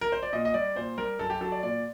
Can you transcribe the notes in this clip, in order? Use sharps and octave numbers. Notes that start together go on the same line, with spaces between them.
A#4
C5
D5
A#2 D#5
D#5
G3 D5
A#2 C5
G3 A#4
F#2 A4
G4
F#3 A4
D5
A#2 D5